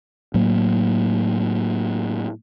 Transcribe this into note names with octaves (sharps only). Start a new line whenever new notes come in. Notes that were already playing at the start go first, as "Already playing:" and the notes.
A2 F#3 A#3